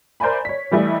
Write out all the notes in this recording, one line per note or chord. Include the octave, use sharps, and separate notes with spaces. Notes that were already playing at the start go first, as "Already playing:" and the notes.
A#4 C5 D5 E5 G#5 B5
C#5 B6
E3 G3 A3 E4 D#5